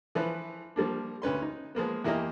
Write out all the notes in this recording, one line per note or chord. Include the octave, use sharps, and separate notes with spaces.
E3 F3 B4
F3 G3 A#3 D4
D2 C#4 B4 C6
D#4
F3 G#3 A#3 B3
E2 A#3 E4 G4 A#4 D#5